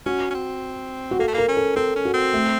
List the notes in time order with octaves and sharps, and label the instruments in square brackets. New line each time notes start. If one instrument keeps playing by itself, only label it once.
[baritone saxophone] C#4 [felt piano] F#4
[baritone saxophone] C#4
C4
[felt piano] F#4
[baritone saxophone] A#3 [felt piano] A4
[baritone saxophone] A3
[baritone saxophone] A#3 [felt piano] A#4
[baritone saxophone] C#4
[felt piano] A4
[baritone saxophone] C4 [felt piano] A4
[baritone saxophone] C#4
[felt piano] F#4
[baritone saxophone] C4
[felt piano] A3